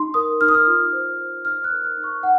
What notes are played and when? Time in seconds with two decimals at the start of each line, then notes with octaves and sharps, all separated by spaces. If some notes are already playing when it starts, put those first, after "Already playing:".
Already playing: D#4 C6
0.14 A#4 D#6
0.41 D#4 F6
0.48 D#6
0.55 F6
0.67 F4
0.93 C5
1.19 C5
1.45 D#4 F6
1.64 F#6
1.71 A#4
1.84 F6
1.98 D#4
2.04 C#6
2.23 D#4 F#5